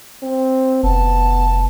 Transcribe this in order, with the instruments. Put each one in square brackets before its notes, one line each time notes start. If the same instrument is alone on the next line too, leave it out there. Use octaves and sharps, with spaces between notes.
[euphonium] C4
[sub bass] F1 [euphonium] B3 [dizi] A5